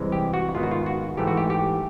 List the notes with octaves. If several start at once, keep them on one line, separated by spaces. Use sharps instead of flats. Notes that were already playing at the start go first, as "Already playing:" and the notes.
Already playing: C2 C3 E3 G#3
G4
F#4
G#2 D#3 G#3 B3 F4
F#4
F4
F#4
G#2 E3 A3 G4
F#4
G4
G4